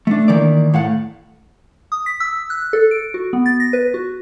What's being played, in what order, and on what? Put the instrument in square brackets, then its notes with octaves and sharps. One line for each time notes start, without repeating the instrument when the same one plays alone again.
[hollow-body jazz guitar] A3 D4
D#3 E3 A#3 D5
A2 F5 F#5
[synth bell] D#6
B6
E6
F#6
A4
D7
F#4
B3
A6
A#6
B4
F#4